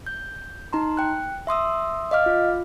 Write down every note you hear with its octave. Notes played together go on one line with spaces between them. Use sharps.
G6
D#4 A#5 C6
G5 F#6
E5 C6 D#6 E6
D#5 F5 D6 F6
F4